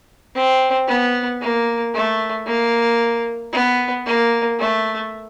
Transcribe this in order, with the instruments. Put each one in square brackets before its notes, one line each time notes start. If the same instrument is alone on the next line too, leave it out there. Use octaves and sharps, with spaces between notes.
[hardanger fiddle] C4
B3
A#3
A3
A#3
B3
A#3
A3